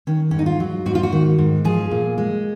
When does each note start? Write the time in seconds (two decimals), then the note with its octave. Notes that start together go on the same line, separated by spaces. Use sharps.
0.07 D#3 C#4
0.31 G#2 C#4
0.39 D#4
0.46 F4
0.60 F#3
0.86 G#2 F#4
0.95 F4
1.03 F#4
1.12 D#3
1.38 G#2
1.65 F3 G#4
1.91 A#2
2.18 G#3